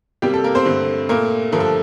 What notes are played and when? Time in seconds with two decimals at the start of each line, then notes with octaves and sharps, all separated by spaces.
0.22 C3 G3 A#3 G4
0.34 A4
0.44 A#3 A#4
0.55 C4 C5
0.65 G2 D3 A3
1.09 A#2 A3 A#3 A#4
1.52 G2 D3 F3 A3 A#4
1.60 A4